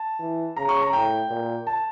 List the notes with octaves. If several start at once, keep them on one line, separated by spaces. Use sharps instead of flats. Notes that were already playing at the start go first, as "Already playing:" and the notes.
Already playing: A5
E3
C#3 A#5
C#6
A#5
A2 G5
A#2
A5